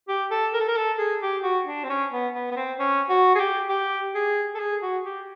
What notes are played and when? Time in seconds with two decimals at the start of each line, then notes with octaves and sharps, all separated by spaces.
0.08 G4
0.31 A4
0.54 A#4
0.60 A4
0.68 A#4
0.76 A4
0.98 G#4
1.22 G4
1.43 F#4
1.66 D4
1.84 C4
1.90 C#4
2.12 B3
2.34 B3
2.51 B3
2.56 C4
2.79 C#4
3.09 F#4
3.35 G#4
3.39 G4
3.69 G4
4.15 G#4
4.55 A4
4.60 G#4
4.82 F#4
5.05 G4